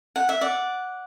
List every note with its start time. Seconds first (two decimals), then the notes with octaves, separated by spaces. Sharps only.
0.16 F#5
0.29 E5
0.41 D5 F#5